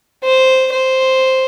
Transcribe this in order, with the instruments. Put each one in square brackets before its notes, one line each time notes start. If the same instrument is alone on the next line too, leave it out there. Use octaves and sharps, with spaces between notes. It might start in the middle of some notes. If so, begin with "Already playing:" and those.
[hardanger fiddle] C5
C5